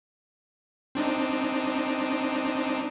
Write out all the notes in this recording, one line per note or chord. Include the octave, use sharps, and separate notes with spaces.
C4 D4 D#4